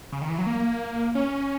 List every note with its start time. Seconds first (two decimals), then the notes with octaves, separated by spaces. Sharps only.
0.12 C#3
0.21 D#3
0.30 E3
0.38 F#3
0.47 A#3
1.15 C#4